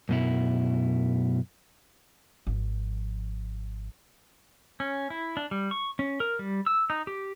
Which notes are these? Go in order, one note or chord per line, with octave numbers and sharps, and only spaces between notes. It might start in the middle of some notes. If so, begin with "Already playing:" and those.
F#2 B2 E4
G#1 F3
C#4
E4
D4
G3
C#6
C#4
A#4
G3
E6
D#4
G4